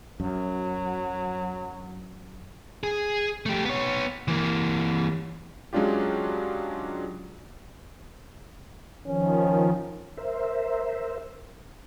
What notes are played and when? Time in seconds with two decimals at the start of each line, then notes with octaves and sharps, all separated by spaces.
0.20 F#2 F#3
2.83 G#4
3.46 A3 G4
3.65 B3 C#5
4.28 E3 A#3
5.73 F#3 G#3 C#4 D4 F4 G4
9.06 D#3 F3 C#4
10.17 A#4 C5 E5